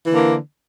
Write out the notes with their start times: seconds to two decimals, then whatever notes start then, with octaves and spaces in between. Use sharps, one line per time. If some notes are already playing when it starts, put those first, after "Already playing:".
0.05 E3
0.10 D3
0.14 A#3